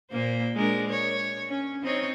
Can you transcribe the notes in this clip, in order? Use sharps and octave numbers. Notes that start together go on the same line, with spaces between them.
A#2 A#3 C5
G#3 D4 A#4
C#5
C#4
C4 D#4 C#5